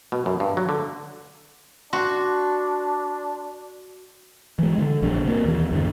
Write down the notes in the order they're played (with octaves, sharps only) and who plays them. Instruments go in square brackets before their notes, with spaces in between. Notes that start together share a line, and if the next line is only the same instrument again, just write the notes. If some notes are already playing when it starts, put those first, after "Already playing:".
[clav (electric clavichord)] B2
F#2
G2
F#3
D3
[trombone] D4 [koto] F#4 [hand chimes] C6
[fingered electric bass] E3 G#3
D3
A#1 G3 D4
C3 A#3
D#2 E3
E2 G2 D3